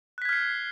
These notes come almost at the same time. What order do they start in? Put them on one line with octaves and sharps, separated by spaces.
F#6 B6 G#6 F6 C7